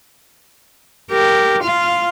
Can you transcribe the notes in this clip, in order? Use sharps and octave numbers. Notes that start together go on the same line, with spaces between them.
G4 A#4
F4 F5